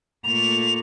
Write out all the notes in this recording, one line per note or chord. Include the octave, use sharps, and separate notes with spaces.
A#2 A3 F7